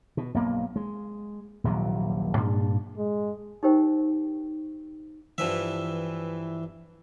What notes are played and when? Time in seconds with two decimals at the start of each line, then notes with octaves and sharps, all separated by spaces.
0.17 B2
0.34 B1 G2 A#3
0.76 G#3
1.64 D#1 A#1 C3 F#3
2.37 G2 A#2 D4
2.98 G#3
3.63 D#4 G4 A#4 C5 G5
5.38 G2 E3 F3 E5